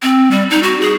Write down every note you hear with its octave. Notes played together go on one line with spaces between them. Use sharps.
C4
G3
D#4
F#4
G#4